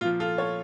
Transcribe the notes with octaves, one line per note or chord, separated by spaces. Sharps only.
A#2 F3 F4
F4 A4
A4 C#5